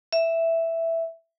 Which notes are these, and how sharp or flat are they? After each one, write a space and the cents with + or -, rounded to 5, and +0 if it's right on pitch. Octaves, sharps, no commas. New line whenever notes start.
E5 +0